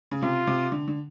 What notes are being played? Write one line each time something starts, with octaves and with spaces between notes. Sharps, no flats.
C#3
C3 F4
C3
D3
D3